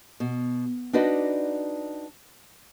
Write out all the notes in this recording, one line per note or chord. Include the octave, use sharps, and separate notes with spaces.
B2
D4 D#4 F#4 B4 D5 D#5